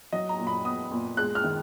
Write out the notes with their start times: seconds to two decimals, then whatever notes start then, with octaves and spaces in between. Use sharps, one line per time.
0.13 F#3 D#5
0.29 A#5
0.38 A#2
0.47 B5
0.64 B3 D#6
0.91 A#2
1.17 G#3 F#6
1.35 F6
1.44 D#3